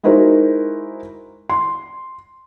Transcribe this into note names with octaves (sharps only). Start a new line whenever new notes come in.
G#3 D#4 E4 F#4 A#4 C5
C6